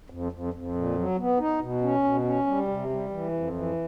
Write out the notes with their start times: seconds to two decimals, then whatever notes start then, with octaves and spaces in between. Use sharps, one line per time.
0.10 F2
0.32 F2
0.54 F2
0.75 A#2
0.96 F#3
1.18 B3
1.39 D#4
1.60 B2
1.82 C#4
2.04 B2
2.25 C#4
2.46 G3
2.68 C3
2.90 G3
3.11 E3
3.32 F2
3.54 E3